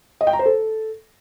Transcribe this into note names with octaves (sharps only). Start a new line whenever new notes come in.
D#5
G5
A#5
C5
A4